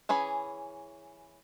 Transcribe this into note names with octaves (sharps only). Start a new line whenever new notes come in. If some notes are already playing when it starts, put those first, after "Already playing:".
E3 C#4 G#4 B5